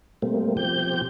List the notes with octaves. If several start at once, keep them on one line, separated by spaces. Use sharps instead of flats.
B2 G3 A3 A#3 C4
B2 F3 C4 G4 G6